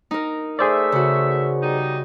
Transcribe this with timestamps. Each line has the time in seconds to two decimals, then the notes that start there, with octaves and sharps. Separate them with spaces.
0.11 D#4 A#4
0.59 A3 G#4 C5 D5 E5
0.92 C#3 F#4
1.61 G3 D#4